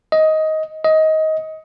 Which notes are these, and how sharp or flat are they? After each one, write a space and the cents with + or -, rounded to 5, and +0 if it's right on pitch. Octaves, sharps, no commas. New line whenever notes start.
D#5 +15
D#5 +20